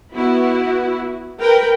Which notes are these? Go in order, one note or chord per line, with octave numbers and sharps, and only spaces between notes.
B3 E4 F#4
A#4 B4 G5